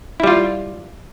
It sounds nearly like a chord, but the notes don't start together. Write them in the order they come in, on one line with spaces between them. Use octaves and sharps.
E4 G3 F4